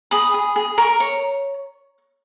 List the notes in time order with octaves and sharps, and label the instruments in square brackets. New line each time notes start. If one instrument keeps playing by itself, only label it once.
[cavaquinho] G#4 B5 D#6
G#4
G#4
A#4 A#5 C#6
C#5